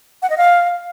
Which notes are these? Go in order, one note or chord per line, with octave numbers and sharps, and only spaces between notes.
F#5
D#5
F5